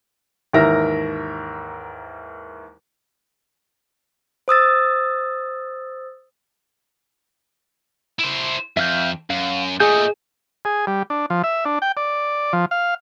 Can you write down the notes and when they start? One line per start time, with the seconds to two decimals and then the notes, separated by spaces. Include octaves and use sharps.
0.53 D#2 G#2 E3 A#4 E5 A#6
4.48 C5 D#6 E6 A6
8.19 E4 C5
8.77 F2 E5 F5 G6
9.30 F#2 F5
9.80 A#2 A3 G#4 D#5 G6
10.65 G#4
10.87 G3
11.10 D4
11.30 F3
11.44 E5
11.65 D4
11.82 G5
11.97 D5
12.53 F3
12.71 F5